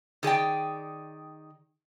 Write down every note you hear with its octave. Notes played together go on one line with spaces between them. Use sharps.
D#3 G#4 D5 G5